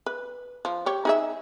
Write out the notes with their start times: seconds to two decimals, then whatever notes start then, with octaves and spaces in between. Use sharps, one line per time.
0.06 B4
0.65 F3
0.86 G4 C#5
1.05 D#4 G#4 E5